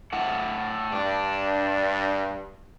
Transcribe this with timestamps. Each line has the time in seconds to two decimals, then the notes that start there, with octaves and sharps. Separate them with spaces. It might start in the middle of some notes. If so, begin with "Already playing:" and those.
0.13 A2 A3 F#5
0.92 G2 D4